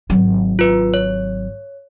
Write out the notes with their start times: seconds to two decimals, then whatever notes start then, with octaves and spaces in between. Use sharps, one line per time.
0.10 G#1 F#3
0.59 F4 B4
0.94 C#5